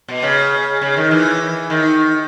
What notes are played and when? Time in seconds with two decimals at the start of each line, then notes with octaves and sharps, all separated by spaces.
0.08 B2
0.23 C#3
0.82 C#3
0.97 D#3
1.11 E3
1.70 D#3